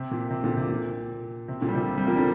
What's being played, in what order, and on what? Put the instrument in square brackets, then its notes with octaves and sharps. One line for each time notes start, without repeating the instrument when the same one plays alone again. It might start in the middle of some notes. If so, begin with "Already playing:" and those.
Already playing: [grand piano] C3
A#2
C3
A#2 D3
C3
A#2
C3
A#2 D3
G3
C3 F3
G3 C4
F3 A#3
D3 G3